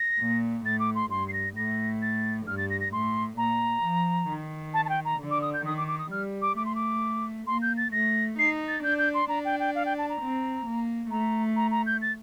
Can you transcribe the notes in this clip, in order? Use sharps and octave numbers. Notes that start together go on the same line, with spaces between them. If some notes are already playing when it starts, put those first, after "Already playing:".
Already playing: A#6
A#2
A2 A6
D6
C6
G2 C6
C7
A#6
A2 A#6
A6
G2 F6
A6
A#6
A#6
A2 C6
A#2 A#5
F3
D#3
A5
A5
G5
A#5
D3
D6
D#6
G6
D#3 D#6
D6
D6
D#6
G3 F6
D6
A3 D6
C6
D6
A#3 C6
G6
A6
A3 A#6
D#4 C7
A6
D4 G6
G6
C6
D4 A#5
G5
G5
F5
G5
A5
A#5
C4
A#3
A3 A#5
A#5
A#5
G6
A6